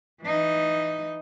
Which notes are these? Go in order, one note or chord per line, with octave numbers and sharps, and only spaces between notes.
E3 D#4